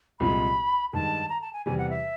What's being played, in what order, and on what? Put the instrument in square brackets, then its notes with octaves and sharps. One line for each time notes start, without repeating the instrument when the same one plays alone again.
[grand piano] C2 A#2 F3 G#3 C4 [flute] B5
[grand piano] G2 D#3 G#3 [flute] A5
[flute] A#5
A5
G#5
[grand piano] E2 C3 E3 G3 [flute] G#5
[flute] F#5
E5